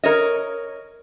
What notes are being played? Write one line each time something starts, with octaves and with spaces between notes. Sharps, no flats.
A#4 C#5 D#5